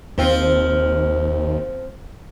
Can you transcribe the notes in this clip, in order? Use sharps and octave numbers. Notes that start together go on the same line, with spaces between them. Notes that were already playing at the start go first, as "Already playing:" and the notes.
D#2 F3 C4 F4